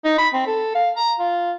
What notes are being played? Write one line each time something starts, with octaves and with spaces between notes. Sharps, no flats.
D#4
B5
C4
A4
F5
A#5
F4